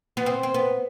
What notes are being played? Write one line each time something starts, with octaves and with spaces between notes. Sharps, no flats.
B3
C4
C4
B3